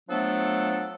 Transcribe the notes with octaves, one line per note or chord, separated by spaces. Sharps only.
F3 F#3 A3 B3 D4 A4